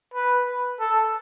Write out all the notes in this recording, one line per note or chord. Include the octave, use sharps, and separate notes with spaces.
B4
A4